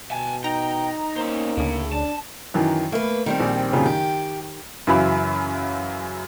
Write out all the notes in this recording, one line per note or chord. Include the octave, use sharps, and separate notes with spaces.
B2 G#5 A5
D#4 G5 A#5
A#3 C#4 C5
D2 A2 C#3
D4 A5
F#2 D#3 E3
A3 A#3 B4
D#3 G3 C4
A#1
F#2 A#2 C#3
D#3 G4
F#2 C#3 E3 F#3 E4 B5